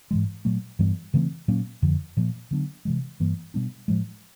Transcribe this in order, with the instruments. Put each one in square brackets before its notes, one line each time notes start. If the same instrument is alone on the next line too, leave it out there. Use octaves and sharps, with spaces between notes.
[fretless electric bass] G#2 E3 G#3
A#2 F#3 A3
G2 E3 G3 B3
C#3 E3 A3 C4
A#2 F#3 A#3 C#4
F2 D3 F3
A#2 F3 A#3
D3 F#3 B3 D4
C3 E3 G#3
G2 E3 G3 A#3
B2 G3 B3 D4
A2 F3 G#3